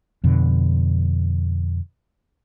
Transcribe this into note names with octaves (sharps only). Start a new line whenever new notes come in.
F2 B2 D3